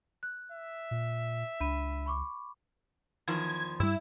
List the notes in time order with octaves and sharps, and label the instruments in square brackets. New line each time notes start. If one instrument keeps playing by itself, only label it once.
[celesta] F#6
[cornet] E5
[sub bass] A#2
[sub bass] C#2 [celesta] D4 B5 D#7
[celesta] B5 C#6 D6
[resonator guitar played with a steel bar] E2 D#3 F3 [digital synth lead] G#6
[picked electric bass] G2 G3 [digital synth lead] E4